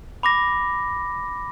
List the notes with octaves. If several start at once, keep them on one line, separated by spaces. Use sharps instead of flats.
B5 D6 A#6